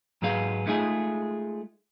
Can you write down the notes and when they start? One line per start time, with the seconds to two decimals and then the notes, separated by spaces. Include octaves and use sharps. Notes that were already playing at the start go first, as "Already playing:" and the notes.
0.22 G#2 F#3 B3 G#4 F5
0.66 G#3 A3 D#4 F4 G#4